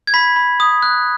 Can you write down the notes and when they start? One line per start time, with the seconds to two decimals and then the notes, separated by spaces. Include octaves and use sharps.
0.07 G#6
0.14 B5 B6
0.36 B5
0.60 D#6
0.82 F#6